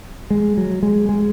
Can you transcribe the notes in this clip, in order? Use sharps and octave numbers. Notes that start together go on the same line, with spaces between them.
G#3
F#3
G#3
G#3